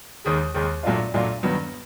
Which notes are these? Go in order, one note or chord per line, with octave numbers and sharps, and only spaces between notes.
D#2 D#3 G#3
D#2 D#3 G#3
A#2 F#3 A3 D4 F4
A#2 F#3 A3 D4 F4
G2 D#3 F#3 B3